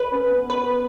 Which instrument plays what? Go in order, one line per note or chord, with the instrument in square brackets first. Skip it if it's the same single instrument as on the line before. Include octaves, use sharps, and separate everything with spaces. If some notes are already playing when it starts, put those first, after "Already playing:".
Already playing: [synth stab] B4
[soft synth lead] C#4
B3
[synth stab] B4